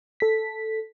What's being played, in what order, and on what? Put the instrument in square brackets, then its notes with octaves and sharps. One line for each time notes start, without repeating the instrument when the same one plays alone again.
[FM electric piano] A4 B6